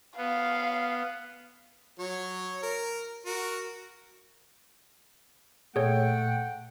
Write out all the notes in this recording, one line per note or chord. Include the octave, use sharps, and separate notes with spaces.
B3 F5
F#3 C#5
A#4
F#4 A#4
A#2 A3 G#4 C#5 F#5 G5